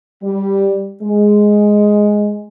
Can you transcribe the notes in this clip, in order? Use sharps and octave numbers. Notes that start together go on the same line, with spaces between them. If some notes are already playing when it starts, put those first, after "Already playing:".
G3
G#3